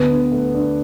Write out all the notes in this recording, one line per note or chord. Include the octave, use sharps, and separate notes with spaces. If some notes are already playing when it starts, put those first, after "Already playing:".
Already playing: D2 B3
D3
A3
D4